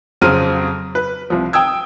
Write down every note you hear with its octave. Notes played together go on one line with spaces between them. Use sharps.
F2 C#3 F#3 C4 F6 D#7
B4
C2 F3
G5 D#6 E6 G#6